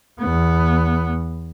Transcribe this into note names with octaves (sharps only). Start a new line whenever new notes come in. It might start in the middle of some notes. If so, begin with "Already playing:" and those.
E2 B3